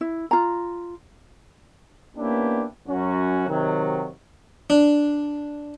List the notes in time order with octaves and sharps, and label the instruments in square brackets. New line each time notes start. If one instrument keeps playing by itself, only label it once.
[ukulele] E4
F4 A#5
[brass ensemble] A#3 B3 C#4 D4 E4 G4
F#2 C#4 F#4
C3 D#3 F#3
[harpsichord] D4